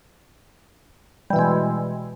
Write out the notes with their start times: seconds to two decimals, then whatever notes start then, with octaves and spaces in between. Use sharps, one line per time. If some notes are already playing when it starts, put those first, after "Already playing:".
1.30 G3
1.33 E3
1.36 B2
1.39 G#3